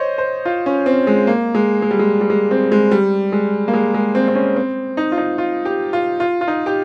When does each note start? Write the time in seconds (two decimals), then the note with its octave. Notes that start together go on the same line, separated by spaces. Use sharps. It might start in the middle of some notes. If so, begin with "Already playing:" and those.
Already playing: C5 C#5 D#5
0.18 C5
0.45 F4
0.66 C#4
0.86 C4
1.07 G#3
1.27 A#3
1.55 G#3
1.82 G#3
1.91 G3
1.99 G#3
2.21 G3
2.30 G#3
2.51 C4
2.72 G#3
2.91 G3
3.32 G#3
3.68 A#3
3.74 G#3
3.94 G#3
4.15 C4
4.28 C4
4.35 C#4
4.56 C4
4.97 D#4
5.12 F4
5.17 D#4
5.38 F4
5.65 G4
5.93 F4
6.20 F4
6.41 F4
6.48 D#4
6.66 G4